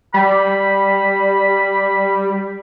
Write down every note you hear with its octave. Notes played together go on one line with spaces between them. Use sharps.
G3 B5